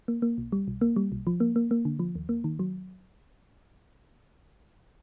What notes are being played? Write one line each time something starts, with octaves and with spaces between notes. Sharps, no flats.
A#3
A#3
B1
G3
B1
A#3
G3
B1
F3
A#3
A#3
A#3
D3
F3
D#2
A#3
D#3
F#3